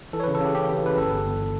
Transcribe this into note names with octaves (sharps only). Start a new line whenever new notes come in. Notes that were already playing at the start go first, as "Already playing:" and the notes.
E3 A4
C#5
B4
C#3
A4
C#3 G4
C#3 G4
C#3
E3 B4
G1 A4
G1
G1